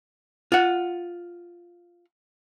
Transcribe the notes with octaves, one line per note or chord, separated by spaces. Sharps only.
F4 F#5